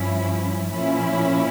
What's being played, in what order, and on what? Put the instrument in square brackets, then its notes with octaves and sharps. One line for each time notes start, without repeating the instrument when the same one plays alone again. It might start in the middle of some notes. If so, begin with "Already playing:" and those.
Already playing: [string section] G2 F3 C#4 E4
A#2 F3 C#4 E4